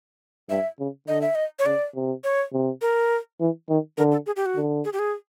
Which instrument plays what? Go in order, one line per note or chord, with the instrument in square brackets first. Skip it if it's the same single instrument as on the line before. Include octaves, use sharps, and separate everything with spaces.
[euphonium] G2 [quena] E5
[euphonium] C#3
[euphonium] D3 [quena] D#5
[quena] E5
D#5
C#5
[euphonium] C#3 [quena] D5
[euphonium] C3
[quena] C#5
[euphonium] C3
[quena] A#4
[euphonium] E3
D#3
[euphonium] D3 [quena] A#4
[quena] A4
G#4
G4
F#4
[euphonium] D3
[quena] G#4
G4
G#4